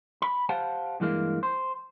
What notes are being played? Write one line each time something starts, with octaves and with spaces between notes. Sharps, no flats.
B5
G4 C5 F5 F#5 A5
G2 E3 G#3 A#3
C5